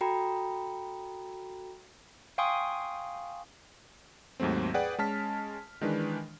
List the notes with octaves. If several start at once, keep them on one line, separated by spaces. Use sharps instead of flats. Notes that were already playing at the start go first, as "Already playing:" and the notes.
F#4 A4 G5 A#5 B5
F5 G5 G#5 C6 C#6 D#6
D#2 G#2 F#3 A3 C4
G#4 B4 D5 F#5 G5
G#3 C#4 A5 F6 B6
D#3 E3 G#3 D4 B4